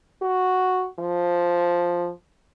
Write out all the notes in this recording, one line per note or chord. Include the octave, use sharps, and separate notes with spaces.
F#4
F3